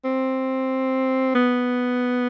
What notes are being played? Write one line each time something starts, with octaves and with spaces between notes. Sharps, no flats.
C4
B3